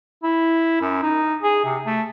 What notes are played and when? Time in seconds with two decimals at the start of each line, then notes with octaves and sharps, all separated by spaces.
0.23 E4
0.81 F#2
1.02 D#4
1.43 G#4
1.65 C3
1.86 A3